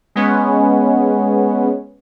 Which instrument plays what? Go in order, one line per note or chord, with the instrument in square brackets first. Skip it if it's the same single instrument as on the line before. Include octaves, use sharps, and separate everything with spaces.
[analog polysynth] G#3 B3 C#4